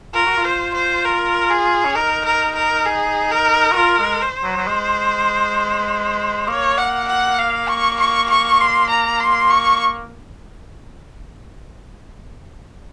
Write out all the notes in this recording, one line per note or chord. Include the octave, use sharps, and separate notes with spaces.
F4 A#4
F#4
F4
C5
C5
A#4
G#4
C#4
D#4 A#4
A#4
A#4
G#4
A#4
F#4
F4 A#4
G#3
C5
F#3
F#3
G#3
A#3 C#5
F#5
F#5
F5
C#6
C#6
C#6
C6
A#5
C6
C#6